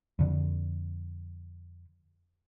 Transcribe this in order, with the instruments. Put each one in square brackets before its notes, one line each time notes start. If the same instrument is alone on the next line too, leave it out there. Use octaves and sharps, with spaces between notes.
[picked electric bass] F2 D3